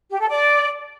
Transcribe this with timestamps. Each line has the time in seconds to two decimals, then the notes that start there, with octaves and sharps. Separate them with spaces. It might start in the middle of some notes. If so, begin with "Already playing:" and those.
0.09 G4
0.19 A4
0.29 D5